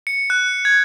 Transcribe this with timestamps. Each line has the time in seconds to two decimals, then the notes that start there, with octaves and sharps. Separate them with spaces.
0.07 C#7
0.30 F#6
0.65 G#6